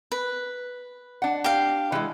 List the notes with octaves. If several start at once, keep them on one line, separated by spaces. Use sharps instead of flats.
B4
D4 F#5
G4 F5
E3 G#3